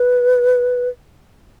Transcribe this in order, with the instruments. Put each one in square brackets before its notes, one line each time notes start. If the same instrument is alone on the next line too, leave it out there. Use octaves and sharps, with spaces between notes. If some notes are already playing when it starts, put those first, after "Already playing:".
Already playing: [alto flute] B4